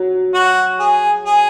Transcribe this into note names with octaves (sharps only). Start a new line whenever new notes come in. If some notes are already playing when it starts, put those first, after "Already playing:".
Already playing: F#3
F#4
G#4
G#4